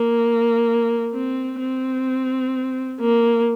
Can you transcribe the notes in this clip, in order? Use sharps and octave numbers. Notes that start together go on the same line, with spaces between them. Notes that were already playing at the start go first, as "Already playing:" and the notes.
Already playing: A#3
C4
C4
A#3